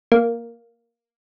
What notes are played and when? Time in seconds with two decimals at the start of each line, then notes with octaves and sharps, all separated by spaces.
0.12 A#3